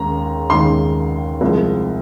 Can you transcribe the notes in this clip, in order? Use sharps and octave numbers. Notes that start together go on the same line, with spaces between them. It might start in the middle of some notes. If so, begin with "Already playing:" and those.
Already playing: D#2 D#3 G#3 C#4 A#5
D#2 D#3 G#3 C#4 C6
C2 C3 F3 G#3